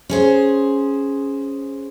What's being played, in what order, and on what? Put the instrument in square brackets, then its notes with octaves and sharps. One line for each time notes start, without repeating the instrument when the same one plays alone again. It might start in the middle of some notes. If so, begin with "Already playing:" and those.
[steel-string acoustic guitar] C#4 G#4 C5